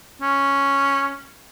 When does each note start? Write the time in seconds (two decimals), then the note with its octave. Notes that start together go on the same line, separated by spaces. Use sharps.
0.22 C#4